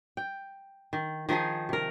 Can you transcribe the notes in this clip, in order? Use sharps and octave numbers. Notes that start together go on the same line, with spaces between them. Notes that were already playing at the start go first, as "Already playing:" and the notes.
G5
D#3
D#3 F3 D#4 G#4
C3 A#4